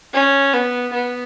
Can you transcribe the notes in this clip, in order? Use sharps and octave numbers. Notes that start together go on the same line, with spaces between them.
C#4
B3
B3